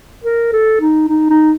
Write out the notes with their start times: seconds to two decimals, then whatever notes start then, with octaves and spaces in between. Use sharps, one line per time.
0.24 A#4
0.53 A4
0.81 D#4
1.09 D#4
1.30 D#4